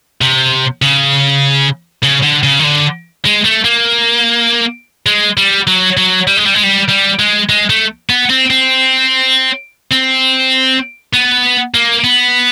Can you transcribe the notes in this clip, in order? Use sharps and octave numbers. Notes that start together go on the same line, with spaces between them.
C3
C#3
C#3
D3
C#3
D#3
D3
G#3
A3
A#3
G#3
G3
F#3
F#3
G3
G#3
G3
G#3
G3
G3
G#3
G#3
A3
B3
C4
C4
C4
B3
A#3
B3